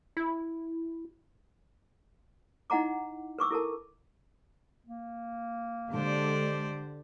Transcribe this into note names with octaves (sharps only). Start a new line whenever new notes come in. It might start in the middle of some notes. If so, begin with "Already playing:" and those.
E4
D#4 E4 D#5 F#5 A#5 D6
B4 C#6 D6 E6
E4 A4 A#4 A5
A#3
D3 G#3 G4 C5 D5